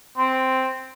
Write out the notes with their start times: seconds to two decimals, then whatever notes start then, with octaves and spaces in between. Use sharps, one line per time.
0.18 C4